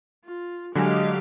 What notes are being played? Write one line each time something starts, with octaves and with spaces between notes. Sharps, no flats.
F4
D3 F#3 G#3 G4 F5